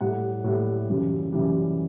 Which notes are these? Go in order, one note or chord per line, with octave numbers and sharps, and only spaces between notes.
A2 G3 F#5
A2 G3
F#2 C#3 E3 G3
F#2 C#3 E3 G3